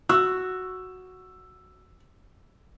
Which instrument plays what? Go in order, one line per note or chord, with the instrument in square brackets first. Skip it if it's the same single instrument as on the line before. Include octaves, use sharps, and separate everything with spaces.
[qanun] F#4 [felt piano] E6